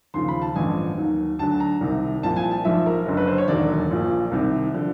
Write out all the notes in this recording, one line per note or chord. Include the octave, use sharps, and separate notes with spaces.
D#2 C#3 F3 C6
B5
A5
A1 G2 D3 F3 G#5
D#2 D#3 F#3
D2 D3 F#3 A5
A#5
C2 C3 D#3
C2 A#2 F3 A5
G#5
A5
A#1 G#2 F3 E5
A#4
F#1 F#2 D3 F#3
B4
C5
C#5
E1 D#2 D3 F#3 D5
A#1 A#2 F3
C2 C3 D#3
D3 F3